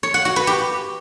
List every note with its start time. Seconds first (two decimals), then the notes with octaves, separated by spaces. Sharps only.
0.03 C#5
0.14 F#5
0.25 F#4
0.36 B4
0.47 G4